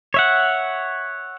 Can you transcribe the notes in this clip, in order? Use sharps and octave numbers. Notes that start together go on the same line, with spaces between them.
C#5 E5 F#5